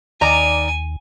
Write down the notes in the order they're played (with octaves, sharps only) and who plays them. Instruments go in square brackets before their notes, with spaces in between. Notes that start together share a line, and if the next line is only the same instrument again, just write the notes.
[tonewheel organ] D#2 [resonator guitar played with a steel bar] D#3 D5 A#5 [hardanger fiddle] G#5